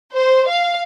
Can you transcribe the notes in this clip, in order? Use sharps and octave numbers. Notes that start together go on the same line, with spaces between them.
C5
F5